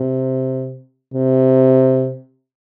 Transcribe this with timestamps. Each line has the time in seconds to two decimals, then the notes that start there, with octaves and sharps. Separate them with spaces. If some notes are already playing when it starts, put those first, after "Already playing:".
Already playing: C3
1.14 C3